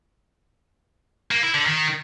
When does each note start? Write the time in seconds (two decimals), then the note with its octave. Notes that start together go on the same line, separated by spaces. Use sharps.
1.31 A#3
1.43 E4
1.54 D3
1.66 D#3